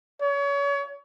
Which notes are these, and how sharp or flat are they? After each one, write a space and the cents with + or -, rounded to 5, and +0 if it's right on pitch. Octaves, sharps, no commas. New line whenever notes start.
C#5 +30